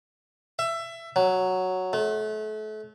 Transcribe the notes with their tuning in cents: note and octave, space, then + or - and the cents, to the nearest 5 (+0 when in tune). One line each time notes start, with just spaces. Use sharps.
E5 +20
F#3 +0
A3 -35